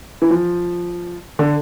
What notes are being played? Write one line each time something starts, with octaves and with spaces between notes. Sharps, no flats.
E3
F3
D3